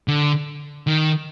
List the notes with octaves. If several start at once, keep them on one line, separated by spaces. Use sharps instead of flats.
D3
D#3